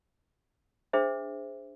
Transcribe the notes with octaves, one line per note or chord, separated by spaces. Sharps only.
D4 G#4 C5 E5